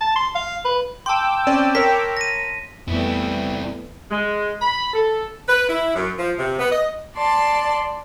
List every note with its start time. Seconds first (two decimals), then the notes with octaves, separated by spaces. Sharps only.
0.01 A5
0.16 C6
0.35 F5
0.65 B4
1.06 G5 A5 C6 D6 E6
1.47 C4 C#4 D5
1.75 A#4 C#5 B6
2.17 A#6 D#7
2.88 F2 E3 G3 A3 B3 C4 E4
4.11 G#3
4.62 B5
4.94 A4
5.49 B4
5.68 E4
5.95 F#2
6.18 F3
6.38 C3
6.59 B3
6.71 D#5
7.16 D5 A5 C6